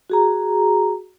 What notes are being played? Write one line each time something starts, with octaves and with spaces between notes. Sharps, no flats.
F#4 G#4 A#5